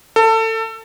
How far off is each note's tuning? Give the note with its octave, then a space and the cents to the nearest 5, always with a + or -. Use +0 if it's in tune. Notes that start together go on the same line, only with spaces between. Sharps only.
A4 +25